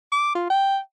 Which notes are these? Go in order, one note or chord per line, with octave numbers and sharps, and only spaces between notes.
D6
F4
G5